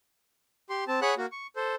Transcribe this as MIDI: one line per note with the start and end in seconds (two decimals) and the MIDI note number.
0.70 0.84 67
0.70 0.84 84
0.88 1.00 60
0.88 1.00 81
1.02 1.15 68
1.02 1.15 73
1.02 1.15 78
1.02 1.15 83
1.02 1.15 90
1.18 1.26 58
1.18 1.26 66
1.32 1.47 85
1.56 1.75 69
1.56 1.75 72